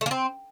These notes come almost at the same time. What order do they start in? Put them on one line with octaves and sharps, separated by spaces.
A3 A#3 C4